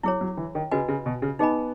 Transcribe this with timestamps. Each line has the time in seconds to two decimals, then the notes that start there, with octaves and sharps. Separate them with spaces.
0.03 F#3 E4 G#4 C#5
0.21 F#3
0.37 E3
0.55 D#3
0.71 C#3 F#4 B4 D#5 G#5
0.89 C#3
1.06 B2
1.22 C#3
1.39 B3 D#4 G#4 D#5 G#5 B5